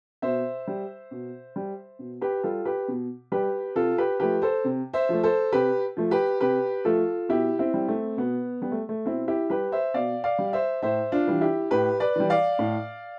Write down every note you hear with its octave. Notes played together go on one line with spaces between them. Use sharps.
B2 C5 E5
G3
B2
G3
B2
G4 B4
G3 F4 A4
G4 B4
B2
G3 G4 B4
C3 F4 A4
G4 B4
F3 A3 G4 B4
A4 C5
C3
C5 E5
F3 A3
A4 C5
C3 G4 B4
F3 A3
G4 B4
C3 G4 B4
F3 A3 F4 A4
B2 E4 G4
C4 E4
G3
A3 C4
B2 B3
G3 B3
A3
A3
B2 C4 E4
E4 G4
G3 G4 B4
C5 E5
B2 D5 F5
D5 F5
G3
C5 E5
A2 C5 E5
D4 F4
E3 G3
E4 G4
A2 G4 B4
B4 D5
E3 G3
D5 F5
A2